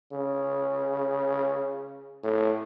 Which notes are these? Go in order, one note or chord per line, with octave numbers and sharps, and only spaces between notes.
C#3
A2